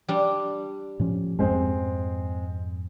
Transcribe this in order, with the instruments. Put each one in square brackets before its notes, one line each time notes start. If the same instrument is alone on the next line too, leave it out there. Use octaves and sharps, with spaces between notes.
[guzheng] G3 D4
[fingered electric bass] A2 F3 C#4
[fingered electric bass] F2 G#2 [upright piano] G#3 C4